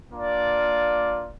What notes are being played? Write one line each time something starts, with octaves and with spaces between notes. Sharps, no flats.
A#3 D4 F4 D5